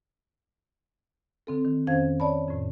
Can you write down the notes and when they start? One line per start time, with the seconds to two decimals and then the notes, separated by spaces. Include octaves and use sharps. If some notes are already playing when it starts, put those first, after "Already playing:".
1.47 D3 C4 A4
1.65 D#3
1.87 F2 D#3 C#4 C5 F5 G#6
2.20 C#5 D5 A5 B5
2.48 F2 A2